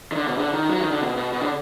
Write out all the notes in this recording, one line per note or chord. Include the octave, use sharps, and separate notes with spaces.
D#3
D3
B2
D3
D#3
F#3
D#3
D3
B2
B2
B2
D3